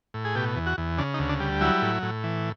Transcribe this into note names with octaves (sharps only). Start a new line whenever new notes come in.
A2
G#4
B2 G4
E2
F#4
E2
C#3 D4
D#4
D2
D4
G3
F#3 E4
A2
A2
E3